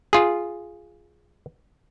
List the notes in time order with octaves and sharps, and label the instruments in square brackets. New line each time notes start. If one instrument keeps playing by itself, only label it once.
[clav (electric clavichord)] F4 G#4